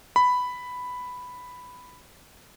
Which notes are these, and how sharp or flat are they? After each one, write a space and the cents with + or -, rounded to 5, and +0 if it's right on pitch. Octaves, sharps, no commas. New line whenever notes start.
B5 +5